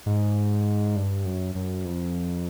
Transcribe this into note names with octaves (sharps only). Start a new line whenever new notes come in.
G#2
G2
F#2
F#2
F2